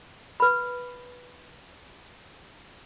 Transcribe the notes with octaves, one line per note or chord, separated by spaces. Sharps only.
B4 B5